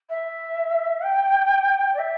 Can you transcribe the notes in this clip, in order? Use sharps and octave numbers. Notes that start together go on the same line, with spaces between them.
E5
G5
D5
E5